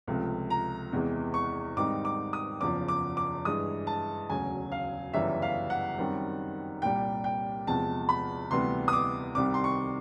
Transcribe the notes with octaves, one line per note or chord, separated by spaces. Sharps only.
C#2 C3 F3 A3
A#5
E2 C3 E3 G#3
C#6
G#2 D#3 G3 C4 D#4 D6
D6
D#6
F#1 E2 C#3 F3 D6
D6
D6
G2 E3 G#3 D#6
A5
E1 D2 C#3 F#3 G#5
F5
G1 F#2 C#3 E3 G3 E5
F5
F#5
F#2 D#3 G3 C4
C2 A#2 G3 G5
G5
E2 C3 F3 G#3 A5
B5
D2 C3 E3 G3 B3 C6
D#6
D6
C2 C3 D#3 G3 C4 D6
C6
C#6